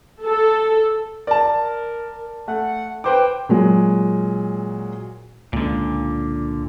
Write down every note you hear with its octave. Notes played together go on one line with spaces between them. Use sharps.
A4
A#4 D5 A5
A3 F#5
B4 C5 G5 D6
A#2 F#3 G#3
C#2 A#2 D3